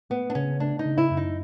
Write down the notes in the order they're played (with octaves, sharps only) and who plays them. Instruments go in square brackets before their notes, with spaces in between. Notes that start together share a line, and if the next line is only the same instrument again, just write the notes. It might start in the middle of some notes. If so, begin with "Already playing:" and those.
[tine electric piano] A3 [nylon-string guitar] B3
[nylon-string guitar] D4
[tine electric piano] C#3 [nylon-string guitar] C#4
[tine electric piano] A3 [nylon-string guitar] D4
[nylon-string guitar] D#4
[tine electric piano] C#3
[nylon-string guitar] E4
[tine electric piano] F#2
[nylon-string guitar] D#4